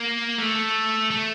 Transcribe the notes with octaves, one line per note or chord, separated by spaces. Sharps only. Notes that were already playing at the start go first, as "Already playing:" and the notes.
Already playing: A#3
A3
A3